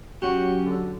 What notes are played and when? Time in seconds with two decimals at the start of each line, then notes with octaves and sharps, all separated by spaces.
0.22 F#3 C#4 F#4 G4
0.64 D3